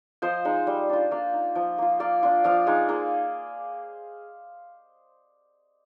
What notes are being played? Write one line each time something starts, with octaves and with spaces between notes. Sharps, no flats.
F3 C5 D#5
G#3 D#4
G3
D4 F4
A#3 D5 F5
D#4
F3
A#3 F4
A#3 D5 F5
D4 F4
F3 D5 F5
G#3 D#4
A#3 G#4 C5